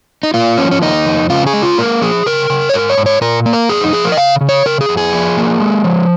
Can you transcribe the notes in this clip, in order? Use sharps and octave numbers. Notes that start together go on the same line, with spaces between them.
D#4
A#3 F4
F3 C#4
C#4
A#3 D#4
F2
C#3 F4
G#4
G#3
F4
A#3 A#4
F3 G#4
C#3 A#4
C#3
C#5
G#2 A#4
C#5
G#2
C#5
A#2 A#4
A#3
A#4
F2 G#4
D#4
F3 G#4
A#4
D#5
C#3 F5
C#3
C#5
C#3 A#4
G#4
F2
G#4
F3
A#3
G#3
F3